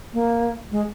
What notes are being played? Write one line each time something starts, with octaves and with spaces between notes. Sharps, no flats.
A#3
G#3